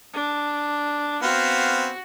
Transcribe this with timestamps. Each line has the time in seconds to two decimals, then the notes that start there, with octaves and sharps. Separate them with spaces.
0.13 D4
1.23 B3 C4 F#4 F5